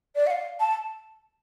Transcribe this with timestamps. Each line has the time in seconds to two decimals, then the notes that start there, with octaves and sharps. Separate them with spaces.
0.15 D5
0.26 F#5
0.30 F5
0.60 A5